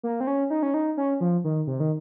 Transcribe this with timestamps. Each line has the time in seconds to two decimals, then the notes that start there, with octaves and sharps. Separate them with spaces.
0.03 A#3
0.20 C4
0.27 C#4
0.50 D#4
0.63 C#4
0.74 D#4
0.97 C#4
1.21 F3
1.44 D#3
1.67 C3
1.80 D#3